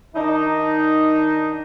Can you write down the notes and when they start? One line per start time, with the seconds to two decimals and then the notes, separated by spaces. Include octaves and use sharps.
0.15 D#3 D4 D#4